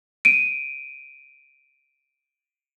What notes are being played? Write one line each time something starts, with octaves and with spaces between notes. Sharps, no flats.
D7 D#7